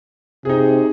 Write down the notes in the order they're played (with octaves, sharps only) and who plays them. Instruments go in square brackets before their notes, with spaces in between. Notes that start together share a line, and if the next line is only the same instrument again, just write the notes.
[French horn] C3 [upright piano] D#4 G#4